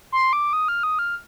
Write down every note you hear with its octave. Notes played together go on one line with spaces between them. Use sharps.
C6
D6
D#6
F6
D#6
F6